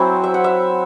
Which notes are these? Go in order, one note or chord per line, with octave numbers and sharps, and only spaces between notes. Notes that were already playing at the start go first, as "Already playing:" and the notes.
Already playing: F#3 C4 E4 G#5
E5
F#5
E5